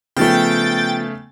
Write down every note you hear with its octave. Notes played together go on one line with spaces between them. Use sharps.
C#3 F3 A3 B3 G5 A6